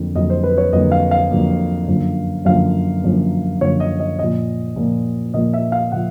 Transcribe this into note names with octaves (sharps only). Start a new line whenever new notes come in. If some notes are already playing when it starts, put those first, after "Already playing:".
Already playing: F2 D3 F#3 A#3
F2 D3 F#3 A#3 D#5
C5
B4
C#5
F2 D3 F#3 A#3 D#5
F5
F5
F2 D3 F#3 A#3
F#2 D3 F3 A#3
F#2 D3 F3 A#3 F5
F#2 D3 F3 A#3
F#2 D3 F3 A#3 C#5
D#5
D#5
A#2 F3 A#3 D#5
A#2 F3 A#3
A#2 F3 A#3 D#5
E5
F5
A#2 F3 F#5